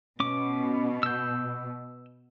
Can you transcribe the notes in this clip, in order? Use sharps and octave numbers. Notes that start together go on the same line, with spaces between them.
B2 C#4 D6
E6 G6